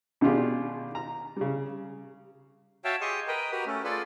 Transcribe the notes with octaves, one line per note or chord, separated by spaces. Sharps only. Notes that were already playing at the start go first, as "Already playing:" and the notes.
B2 D#3 D4 F4 G4 G#4
A#5
C#3 G3
F#4 C#5 E5 F5 G5 A5
G4 G#4 D#5 C6 C#6
A#4 B4 D#5 G5
F#4 G4 A#4 B4
A3 C#4
F4 G#4 A4 B4 D5